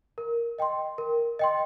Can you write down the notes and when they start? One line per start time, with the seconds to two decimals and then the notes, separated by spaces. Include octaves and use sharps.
0.18 A#4
0.58 D#5 G5 C6
0.98 A#4
1.39 D#5 G5 C6